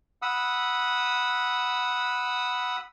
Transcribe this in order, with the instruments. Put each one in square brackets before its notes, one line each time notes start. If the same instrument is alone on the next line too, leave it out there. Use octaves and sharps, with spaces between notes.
[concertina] F#5 B5 D#6 E6